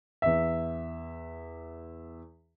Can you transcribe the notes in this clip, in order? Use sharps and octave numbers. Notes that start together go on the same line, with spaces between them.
E2 E5